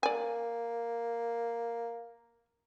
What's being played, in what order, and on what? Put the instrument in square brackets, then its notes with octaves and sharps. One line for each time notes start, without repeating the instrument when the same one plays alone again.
[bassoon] A#3 [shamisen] D5 G#5